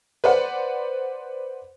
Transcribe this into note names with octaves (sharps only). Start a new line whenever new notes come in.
B4 C5 D5 F#5